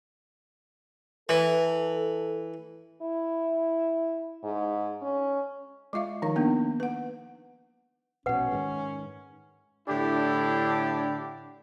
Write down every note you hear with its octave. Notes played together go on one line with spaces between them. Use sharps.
E3 A4
E4
G#2
C#4
G#3 F4 E5 F5
D#3 F3 D#4 F5
A#3 B3 D4 D#4
B4 F#5
A#1 G#2 B2 C#4 B4 F#5
G#2 D#3 G#3
A2 D3 D4 E4 G4